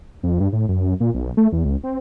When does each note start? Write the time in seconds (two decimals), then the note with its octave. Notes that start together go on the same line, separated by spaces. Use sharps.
0.23 F2
0.40 G2
0.52 A2
0.68 F#2
1.00 A#2
1.14 B1
1.37 A3
1.52 E2
1.65 C#2
1.83 C4